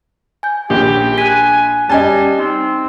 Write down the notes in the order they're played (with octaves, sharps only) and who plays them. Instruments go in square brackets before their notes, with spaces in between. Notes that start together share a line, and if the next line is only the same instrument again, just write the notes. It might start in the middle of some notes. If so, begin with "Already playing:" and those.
[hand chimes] G#5 G6
[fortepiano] A#1 [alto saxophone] G4
[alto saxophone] G#5 [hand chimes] F#6 B6
[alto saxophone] G3 [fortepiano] D#5 G#5 A5
[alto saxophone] C4 [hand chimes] D#4